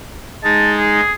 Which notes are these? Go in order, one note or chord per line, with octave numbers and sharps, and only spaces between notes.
G#3 D#4 A5
G#4